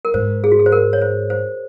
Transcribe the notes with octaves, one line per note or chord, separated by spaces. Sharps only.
A#4
G#2 C5
G#4
F#4
G#4
C5
A#4
C#5
C5
C5